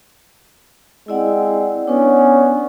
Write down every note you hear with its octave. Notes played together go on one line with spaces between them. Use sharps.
G#3 C4 E4 D5 F#5
B3 C#4 D4 B4 D5